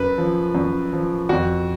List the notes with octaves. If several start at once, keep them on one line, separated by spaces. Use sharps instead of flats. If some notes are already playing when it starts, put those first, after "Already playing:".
Already playing: F#2 B4
F3
F#2
F3
F2 F#4